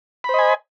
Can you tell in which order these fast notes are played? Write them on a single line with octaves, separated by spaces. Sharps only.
B5 C5 D#5 G#5